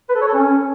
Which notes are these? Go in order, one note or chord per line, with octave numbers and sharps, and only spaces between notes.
B4
A4
C#5
A4
C#4